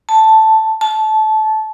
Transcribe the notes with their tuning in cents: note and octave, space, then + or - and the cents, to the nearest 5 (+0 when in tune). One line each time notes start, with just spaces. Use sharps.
A5 +0
A5 -20